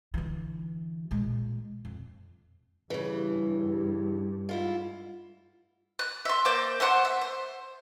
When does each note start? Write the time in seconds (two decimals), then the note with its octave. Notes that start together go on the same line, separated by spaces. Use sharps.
0.14 D3 E3
1.11 A#2 G#3
1.85 F2
2.90 G2 C#3 E3
4.49 G#2 E4 F4
5.99 F#6
6.25 E5 C6
6.45 A#3 C5 D5 G6
6.80 A3 C5 F#5 C6
7.05 E5
7.21 C5